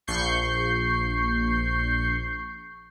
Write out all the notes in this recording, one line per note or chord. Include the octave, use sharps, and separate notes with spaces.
A#1 C#6 G6 C7